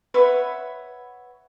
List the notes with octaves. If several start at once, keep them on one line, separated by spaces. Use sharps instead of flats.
B4 C#5 E5 F#5